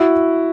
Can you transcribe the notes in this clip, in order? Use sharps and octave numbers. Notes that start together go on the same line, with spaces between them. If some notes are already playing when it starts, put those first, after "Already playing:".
Already playing: E4 F#4